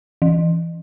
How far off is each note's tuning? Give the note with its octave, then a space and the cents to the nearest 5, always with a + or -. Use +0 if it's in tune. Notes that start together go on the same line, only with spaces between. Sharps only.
E3 +20